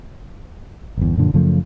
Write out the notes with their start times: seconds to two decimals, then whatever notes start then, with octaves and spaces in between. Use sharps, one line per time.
0.97 G1 E2
1.17 F#2 A#2 D3 F3
1.34 F#2 C#3 F3 A3